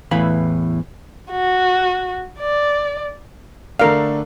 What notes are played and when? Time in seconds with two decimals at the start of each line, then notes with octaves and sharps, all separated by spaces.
0.11 E2 A2 E3 B4 F5 B5
1.31 F#4
2.39 D5
3.80 D3 A3 D4 A#4 F5